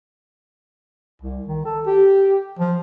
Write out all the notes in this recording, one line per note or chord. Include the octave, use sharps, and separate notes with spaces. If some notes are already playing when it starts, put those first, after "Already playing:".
C2
D#3
A4
G4
F3